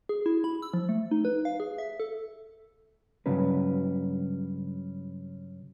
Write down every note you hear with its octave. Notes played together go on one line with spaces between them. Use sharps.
G#4
E4
B5
E6
F3
A3
D#4
B4
F5
G#4
E5
A4
G2 C#3 F#3 C#4 B4